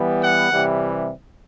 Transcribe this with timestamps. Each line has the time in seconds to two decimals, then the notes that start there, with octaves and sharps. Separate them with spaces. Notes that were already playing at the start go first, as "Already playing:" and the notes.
Already playing: E3 G3 B3
0.22 F#5
0.51 C3 E3 G3